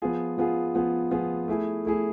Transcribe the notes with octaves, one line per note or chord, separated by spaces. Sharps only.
F3 B3 F4 G#4
F3 B3 F4 G#4
F3 B3 F4 G#4
F3 B3 F4 G#4
A3 E4 G#4
A3 E4 G#4